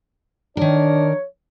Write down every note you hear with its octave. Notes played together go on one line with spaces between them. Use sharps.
D#3 D4 A#4 C#5